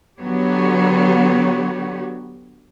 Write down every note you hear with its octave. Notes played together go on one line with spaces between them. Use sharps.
D3 F#3 B3 F#4 G4 C#5